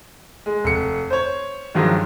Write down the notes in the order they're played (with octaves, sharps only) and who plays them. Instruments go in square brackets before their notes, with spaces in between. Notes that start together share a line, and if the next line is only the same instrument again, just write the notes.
[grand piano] G#3
F1 C#7
C5 C#5
G2 D#3 F3 F#3 G#3